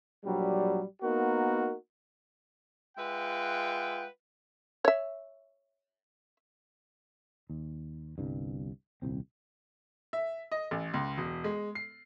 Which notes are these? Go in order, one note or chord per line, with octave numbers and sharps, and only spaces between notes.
A#1 F#3 G3
A#3 B3 D#4 F#4 A#4
G#3 F4 B4 E5 F#5 G5
C#5 E5
D#2
G1 C2 G2
D#1 C2 C4
E5
D#5
A1
C#2
E1
G#3
C7